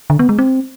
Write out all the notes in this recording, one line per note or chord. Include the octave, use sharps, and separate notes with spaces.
D3
B3
G#3
C4